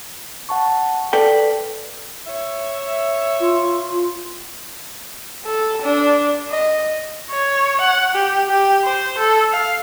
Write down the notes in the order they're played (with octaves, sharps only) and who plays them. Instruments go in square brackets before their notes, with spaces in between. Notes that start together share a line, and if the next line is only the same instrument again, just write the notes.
[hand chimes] F#5 A5 C#6
[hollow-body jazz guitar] A4 D5 G5 [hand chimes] B4 B6
[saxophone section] C#5 E5
[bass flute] F4
[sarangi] A4
D4
D#5
[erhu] C#5
F#5
G4
G4
C5
A4
F5